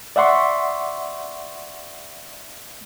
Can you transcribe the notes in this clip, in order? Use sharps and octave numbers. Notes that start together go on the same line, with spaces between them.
D5 E5 F#5 C6 C#6